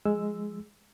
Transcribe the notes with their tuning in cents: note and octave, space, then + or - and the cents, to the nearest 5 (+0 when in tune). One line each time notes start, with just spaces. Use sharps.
F3 +10 G#3 +0 E6 +0